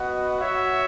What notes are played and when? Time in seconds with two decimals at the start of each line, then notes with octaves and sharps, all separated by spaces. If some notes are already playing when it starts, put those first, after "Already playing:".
Already playing: B3 F#4 B4 D#5 F#5
0.38 F#4 C#5 E5